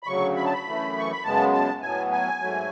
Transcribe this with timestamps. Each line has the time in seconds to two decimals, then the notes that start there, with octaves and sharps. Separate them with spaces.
0.03 B5
0.07 D2 C#3 F#3 C#6
0.36 B5
0.45 A5
0.53 B5
0.66 F#2 E3 A3
0.98 C#6
1.11 B5
1.24 F#2 C#3 G#3 B3 A5
1.53 A5
1.82 A2 F#3 B3 G#5
2.12 G#5
2.41 G#2 F#3 A3